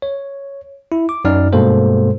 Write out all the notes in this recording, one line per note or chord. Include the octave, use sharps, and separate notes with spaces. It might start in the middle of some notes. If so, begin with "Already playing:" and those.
C#5
E4
D6
F#2 D#4 D5 F6
G2 B2 G#3 A#3 A4 C5